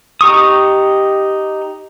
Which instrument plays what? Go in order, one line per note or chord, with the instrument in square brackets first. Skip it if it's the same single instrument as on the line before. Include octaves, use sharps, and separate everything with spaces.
[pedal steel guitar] D#4 G4 C#6 D#6